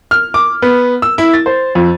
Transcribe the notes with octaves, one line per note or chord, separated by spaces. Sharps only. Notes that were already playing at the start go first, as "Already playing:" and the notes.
F6
D6
B3
E6
E4
A6
C5
F2